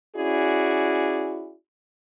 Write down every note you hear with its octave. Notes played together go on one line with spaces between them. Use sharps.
C#4 E4 F#4 G#4 D5